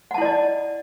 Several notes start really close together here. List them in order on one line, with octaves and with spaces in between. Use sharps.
F#5 A5 E4 D5 D#5